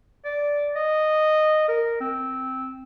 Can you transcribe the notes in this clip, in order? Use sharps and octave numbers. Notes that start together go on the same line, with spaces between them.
D5
D#5
A#4
C4